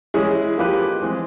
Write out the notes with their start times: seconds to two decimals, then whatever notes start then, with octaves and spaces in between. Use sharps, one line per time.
0.14 E3 G#3 C#4 E4 G#4
0.58 F3 A#3 D#4 G4 B4
1.02 E3 G#3 C4